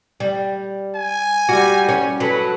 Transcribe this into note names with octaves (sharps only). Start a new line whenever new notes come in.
G3
G#5
G3 F#4
C#4
F#3 A4 B4